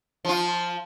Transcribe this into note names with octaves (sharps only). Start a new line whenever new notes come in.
F3 F4